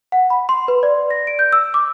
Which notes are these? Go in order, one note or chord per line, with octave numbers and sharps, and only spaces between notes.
F#5
B5
C6
B4
D5
A#6
D7
G6
E6
D6